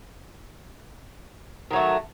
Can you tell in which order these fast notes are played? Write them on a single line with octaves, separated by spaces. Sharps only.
D#3 F#3 A3